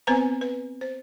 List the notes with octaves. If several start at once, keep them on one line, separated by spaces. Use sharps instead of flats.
B3 C4 B4 C5 G#5 A#5
B4
C5